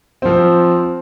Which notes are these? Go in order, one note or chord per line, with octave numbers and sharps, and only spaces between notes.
F3 C4